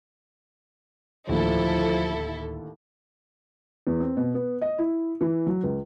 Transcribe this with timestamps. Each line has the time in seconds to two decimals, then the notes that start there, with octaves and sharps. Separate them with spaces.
1.29 D1 D#2 A2 D3 F3 E4 A4
3.87 E2
4.00 C4
4.17 B2
4.34 B3
4.61 D#5
4.78 E4
5.21 E3
5.46 F#3
5.63 C#2